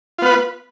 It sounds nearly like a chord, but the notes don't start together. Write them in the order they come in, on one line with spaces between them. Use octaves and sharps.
F4 B3 B4